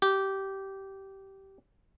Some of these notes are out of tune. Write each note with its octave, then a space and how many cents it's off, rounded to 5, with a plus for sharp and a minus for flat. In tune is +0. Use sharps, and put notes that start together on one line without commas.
G4 -15